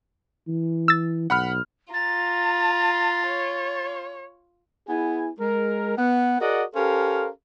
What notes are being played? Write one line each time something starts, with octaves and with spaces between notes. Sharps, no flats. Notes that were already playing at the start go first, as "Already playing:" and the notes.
E3
E6 A6
B1 F#5 B5 F6
F4 A#5 A6
C#5
B3 E4 G#4 G#5
G#3 A#4
B3 F#5
F#4 G#4 A#4 D5 D#5 F#5
C#4 G4 A4 A#4 C5 F5